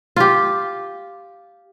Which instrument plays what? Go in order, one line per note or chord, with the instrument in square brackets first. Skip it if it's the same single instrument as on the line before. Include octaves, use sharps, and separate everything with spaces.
[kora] F4 G4